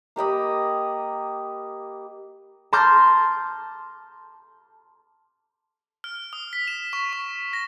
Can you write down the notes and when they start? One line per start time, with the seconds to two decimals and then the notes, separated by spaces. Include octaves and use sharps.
0.16 A#3 G4 D#5 B5
2.73 A5 A#5 C6 D6 F6 G6
6.04 F6
6.33 D#6
6.53 B6
6.68 E7
6.93 C#6
7.13 C#6
7.53 A#6